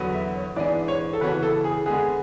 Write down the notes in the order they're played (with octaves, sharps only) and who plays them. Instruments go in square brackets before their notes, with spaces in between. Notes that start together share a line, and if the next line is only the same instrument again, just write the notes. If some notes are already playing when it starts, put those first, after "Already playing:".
Already playing: [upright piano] E2 D3 F#3 B3
[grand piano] E5
C#5
[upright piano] G#2 E3 B3 D4 G#4 [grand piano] D5
[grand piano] C#5
A4
[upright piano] C#3 E3 B3 F#4 C#5 [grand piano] B4
[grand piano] A4
G#4
[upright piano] D3 G#3 B3 [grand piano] G#4